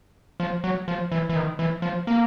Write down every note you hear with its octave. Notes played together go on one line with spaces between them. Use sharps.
F3
F#3
F3
E3
E3
D#3
E3
F3
A#3